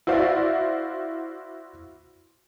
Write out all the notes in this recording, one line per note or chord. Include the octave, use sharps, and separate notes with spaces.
E4 F#4 C5 D5 F5